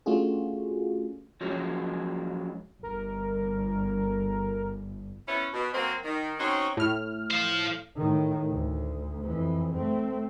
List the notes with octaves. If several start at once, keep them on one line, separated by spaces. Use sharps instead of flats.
A3 C#4 D4 F4 F#4 G#4
F3 F#3 G#3 A#3 C#4
G1 A#4
B3 C#4 E4
B2
F#3 A#3 C4
D#3
C4 C#4 D#4 F#4 C5 C#5
A2 F6
C5 F5
A2 D#3
D2
F2 E3
A3 C4